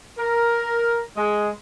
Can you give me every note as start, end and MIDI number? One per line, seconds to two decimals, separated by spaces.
0.18 1.00 70
1.17 1.49 56